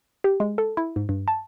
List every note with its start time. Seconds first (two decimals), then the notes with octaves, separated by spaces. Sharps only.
0.24 G4
0.40 G#3
0.58 A4
0.77 E4
0.96 G#2
1.09 G2
1.28 A5